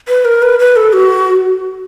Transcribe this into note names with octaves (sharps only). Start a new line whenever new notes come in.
B4
A#4
B4
B4
A4
F#4